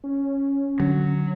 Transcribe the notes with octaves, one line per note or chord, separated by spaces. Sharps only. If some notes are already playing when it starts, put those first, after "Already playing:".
C#4
D3 F#3